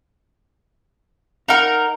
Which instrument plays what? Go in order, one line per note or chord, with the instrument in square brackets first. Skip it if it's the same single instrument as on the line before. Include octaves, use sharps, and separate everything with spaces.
[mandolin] D#4 A#4 [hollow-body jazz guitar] F5 F#5